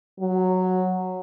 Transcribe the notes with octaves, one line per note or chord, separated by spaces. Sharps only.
F#3